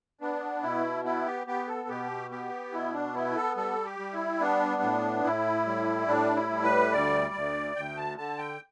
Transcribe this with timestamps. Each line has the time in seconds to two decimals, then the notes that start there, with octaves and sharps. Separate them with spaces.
0.21 B3 D4
0.63 B2 E4
1.04 B3 E4
1.26 G4
1.47 B3 G4
1.68 A4
1.89 B2 G4
2.31 B3 G4
2.73 B2 E4
2.93 D4
3.14 B3 E4
3.36 A4
3.57 G3 A4
3.85 G4
3.99 G3
4.13 E4
4.40 B3 D4
4.82 A2
5.24 A2 E4
5.66 G3
6.08 A2 D4
6.36 E4
6.50 G3
6.64 B4
6.93 D2 D5
7.34 D2
7.76 D2 G5
7.97 A5
8.18 D3 A5
8.38 G5